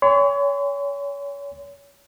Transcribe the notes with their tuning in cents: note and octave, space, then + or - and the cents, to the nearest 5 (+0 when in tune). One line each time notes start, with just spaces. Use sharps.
C#5 +30 G#5 -40 C6 -40